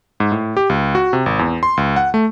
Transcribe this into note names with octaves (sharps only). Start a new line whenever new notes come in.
G#2
A2
G4
C#2
F#4
C3
G#1
E2
C6
C#2
F#5
A3